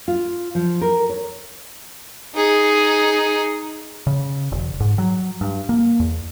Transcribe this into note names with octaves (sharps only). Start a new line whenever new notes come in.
F4
F3
A#4
C#5
D#4 G#4
C#3
E1
G#2
F#3
G2
A#3
E2